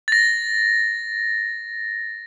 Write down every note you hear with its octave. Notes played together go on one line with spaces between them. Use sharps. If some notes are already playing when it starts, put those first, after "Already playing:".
A6 A#6